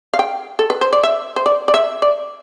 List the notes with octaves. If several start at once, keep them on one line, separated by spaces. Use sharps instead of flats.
F5
G5
A4
B4
C5
D5
E5
C5
D5
D5
E5
D5